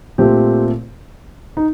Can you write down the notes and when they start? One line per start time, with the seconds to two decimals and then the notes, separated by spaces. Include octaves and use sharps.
0.18 A#2 A3 C4 G4
1.57 D#4